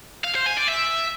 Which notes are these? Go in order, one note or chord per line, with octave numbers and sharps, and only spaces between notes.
F5
C5
G#5
D5
E5